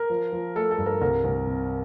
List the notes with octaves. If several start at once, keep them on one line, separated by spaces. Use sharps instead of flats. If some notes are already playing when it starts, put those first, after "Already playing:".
Already playing: A#4
F3
F3
A3 A4
A4
G2
A#4
C2 A#4
C2
C3